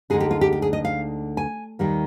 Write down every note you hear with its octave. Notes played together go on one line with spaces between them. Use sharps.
D2 D3 G#3 D#4 G#4
G4
F4
G4
G4
G#4
D#5
F5
G#5
D#2 D#3 G3 A#3